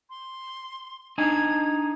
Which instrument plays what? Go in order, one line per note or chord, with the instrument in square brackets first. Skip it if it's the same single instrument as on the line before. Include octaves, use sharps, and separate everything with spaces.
[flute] C6
[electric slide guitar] D4 D#4 G#5 [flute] G#6